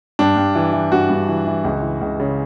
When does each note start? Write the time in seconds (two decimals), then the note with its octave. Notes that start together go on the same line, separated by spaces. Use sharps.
0.19 G2 D4
0.36 G2
0.55 E3
0.73 E3
0.92 G2 F#4
1.10 G2
1.29 E3
1.47 E3
1.64 C#2
1.82 E3
2.01 C#2
2.20 C#3